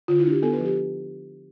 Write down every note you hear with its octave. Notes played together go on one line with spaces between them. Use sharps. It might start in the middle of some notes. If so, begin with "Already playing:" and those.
D3 F4
E4
D4 G4
B3 A4
B4
F3
G4